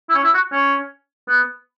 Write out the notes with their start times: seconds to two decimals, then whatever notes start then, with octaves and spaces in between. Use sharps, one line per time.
0.09 E4
0.15 C#4
0.24 E4
0.34 F#4
0.52 C#4
1.28 B3